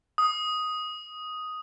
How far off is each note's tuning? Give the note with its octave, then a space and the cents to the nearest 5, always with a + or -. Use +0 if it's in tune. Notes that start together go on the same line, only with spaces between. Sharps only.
D#6 +5